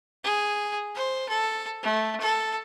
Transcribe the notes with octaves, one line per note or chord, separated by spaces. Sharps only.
G#4
C5
A4
A3
A4